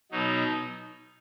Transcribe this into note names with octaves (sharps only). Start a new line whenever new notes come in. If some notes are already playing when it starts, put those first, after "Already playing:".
B2 F#3 D#4